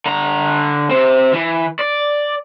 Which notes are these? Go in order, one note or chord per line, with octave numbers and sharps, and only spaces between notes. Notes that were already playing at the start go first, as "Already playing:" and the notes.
D3 A#5
C3 C4
E3
D5